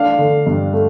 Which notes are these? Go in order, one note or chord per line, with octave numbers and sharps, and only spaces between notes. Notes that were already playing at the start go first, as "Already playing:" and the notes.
Already playing: A3 D4 F5
D3
G2
A3